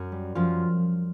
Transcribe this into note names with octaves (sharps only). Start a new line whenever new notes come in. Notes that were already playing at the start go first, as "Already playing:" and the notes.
Already playing: F#2
G3
F#2 F3 F4